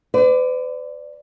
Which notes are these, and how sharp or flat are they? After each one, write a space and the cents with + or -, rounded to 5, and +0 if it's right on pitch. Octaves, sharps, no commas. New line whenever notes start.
B4 +45 D5 +0